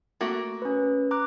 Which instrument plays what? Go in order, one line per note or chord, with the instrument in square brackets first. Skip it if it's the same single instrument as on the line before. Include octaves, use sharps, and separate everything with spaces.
[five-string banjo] A3 A#3 F#4
[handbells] C#4 B4
A#5 D6 F#6